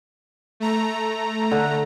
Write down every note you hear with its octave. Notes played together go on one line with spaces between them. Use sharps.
A3 A#5
D3